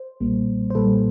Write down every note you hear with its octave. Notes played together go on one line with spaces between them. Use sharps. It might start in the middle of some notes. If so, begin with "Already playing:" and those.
Already playing: C5
B1 A#2 G3 A#3
C5
B1 A#2 G3 A#3 A4 B4